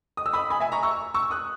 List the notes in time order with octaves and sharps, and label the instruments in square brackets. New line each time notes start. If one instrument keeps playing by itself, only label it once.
[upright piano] D#6
E6
B5 D#6
G#5 B5
E5 G#5
A#5 C#6
C#6 E6
C#6 E6
D#6 F#6